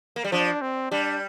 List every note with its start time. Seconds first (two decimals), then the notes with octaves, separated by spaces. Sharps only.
0.16 A#3
0.24 G3
0.32 F3 D4
0.61 C4
0.91 G3 D4